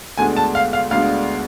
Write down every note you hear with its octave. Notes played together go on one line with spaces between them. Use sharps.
D2 D3 G#3 B3 G#5
A5
F5
F5
D2 D3 G#3 B3 F5